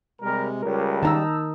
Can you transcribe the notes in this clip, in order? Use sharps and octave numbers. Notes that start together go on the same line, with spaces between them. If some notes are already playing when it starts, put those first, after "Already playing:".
C3 G3 G#3 A#4
C#2 G3 A#4
D#3 D#4 A5 A#5 E6